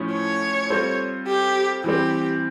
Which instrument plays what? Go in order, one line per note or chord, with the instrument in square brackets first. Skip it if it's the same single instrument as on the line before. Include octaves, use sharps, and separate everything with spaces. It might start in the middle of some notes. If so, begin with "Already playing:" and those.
Already playing: [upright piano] A2 F3 A3 C#4
[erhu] C#5
[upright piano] G3 C4 F4 A4 C5
[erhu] G4
[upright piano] E3 G3 C4 [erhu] G4